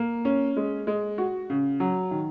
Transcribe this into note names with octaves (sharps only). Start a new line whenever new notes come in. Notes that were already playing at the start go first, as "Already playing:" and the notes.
Already playing: A#3
C#4
G#3
G#3
F#4
C#3
F#3
D#3